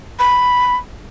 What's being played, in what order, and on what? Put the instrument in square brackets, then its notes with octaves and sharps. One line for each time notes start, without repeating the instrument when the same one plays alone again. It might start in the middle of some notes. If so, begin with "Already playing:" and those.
[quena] B5